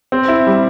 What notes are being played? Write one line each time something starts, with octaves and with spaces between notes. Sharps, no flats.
C4
E4
G3